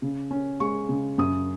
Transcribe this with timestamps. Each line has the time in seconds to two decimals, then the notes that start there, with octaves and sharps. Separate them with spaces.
0.02 C#3
0.31 C#4
0.60 G#3 C#6
0.89 C#3
1.18 F#2 D#6